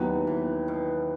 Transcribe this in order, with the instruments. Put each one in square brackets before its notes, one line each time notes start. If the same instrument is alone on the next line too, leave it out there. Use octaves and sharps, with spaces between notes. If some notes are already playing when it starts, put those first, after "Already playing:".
Already playing: [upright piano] D#2 D#3 F#3 B3 [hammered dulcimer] E3
[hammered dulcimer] E3
B2